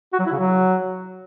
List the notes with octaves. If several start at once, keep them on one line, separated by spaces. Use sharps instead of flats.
F#4
F#3
E4
C#3
F#3